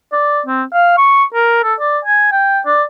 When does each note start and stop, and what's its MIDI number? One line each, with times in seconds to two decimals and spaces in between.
0.12 0.41 74
0.46 0.63 60
0.73 0.95 77
0.98 1.24 85
1.34 1.61 70
1.64 1.74 69
1.80 1.99 74
2.05 2.28 80
2.32 2.60 79
2.66 2.83 74